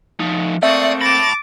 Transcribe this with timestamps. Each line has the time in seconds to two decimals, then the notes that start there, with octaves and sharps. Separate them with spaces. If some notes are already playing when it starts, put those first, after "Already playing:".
0.20 F3 D#4
0.63 A3 A#3 C4 D5 E5 C#6 D#6
1.01 A5 B5 D6 A6 A#6